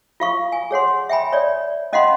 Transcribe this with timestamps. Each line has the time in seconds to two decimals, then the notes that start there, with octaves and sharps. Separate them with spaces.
0.20 F4 F5 C#6
0.52 G#5
0.71 G#4 C#5 F#5 C6
1.09 E5 G5 G#5 B5
1.33 C#5 D5
1.93 C#4 D#5 F5 F#5 B5 C6